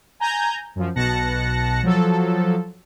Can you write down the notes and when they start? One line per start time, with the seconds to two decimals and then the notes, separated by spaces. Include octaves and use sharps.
0.20 G#5 A#5 G6 G#6
0.76 F#2 F3
0.95 B1 B2 A5 F#6 A#6 C#7
1.83 F3 F#3 A4